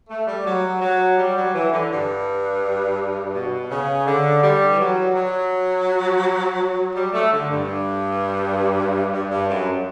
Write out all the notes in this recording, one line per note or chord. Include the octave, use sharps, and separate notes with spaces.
A3
G3
F#3
F#3
G3
F#3
E3
D3
G2
B2
C#3
D3
G3
E3
F#3
F#3
G3
A3
D3
G2
G2
G2
F#2